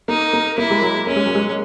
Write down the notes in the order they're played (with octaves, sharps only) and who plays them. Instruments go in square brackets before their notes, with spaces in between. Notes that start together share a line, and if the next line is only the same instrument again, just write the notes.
[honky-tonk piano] A#3 [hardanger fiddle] D#4
[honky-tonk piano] A#3
[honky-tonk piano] A#3 [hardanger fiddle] E4
[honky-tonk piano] G#3
F#3
[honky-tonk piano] A#3 [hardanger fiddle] C#4
[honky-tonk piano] G#3
F#3
G#3